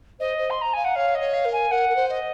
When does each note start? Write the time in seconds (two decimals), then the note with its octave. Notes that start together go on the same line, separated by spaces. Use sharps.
0.20 C5 D#5
0.38 C5
0.50 C6
0.61 A#5
0.73 F5 G#5
0.84 F#5
0.95 C#5 F5
1.14 D#5
1.20 C#5
1.33 F5
1.45 A#4
1.52 G#5
1.71 A#4 F#5
1.89 A#4
1.96 C5
2.09 D#5